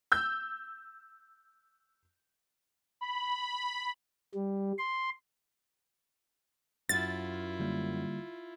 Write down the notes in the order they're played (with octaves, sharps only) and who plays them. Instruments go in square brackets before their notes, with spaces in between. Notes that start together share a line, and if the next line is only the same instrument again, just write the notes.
[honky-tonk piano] E6 G6
[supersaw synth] B5
[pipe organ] G3
C6
[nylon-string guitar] F#2 [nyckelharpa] E4 F4 [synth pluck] A6
[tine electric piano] D3 G3 A#3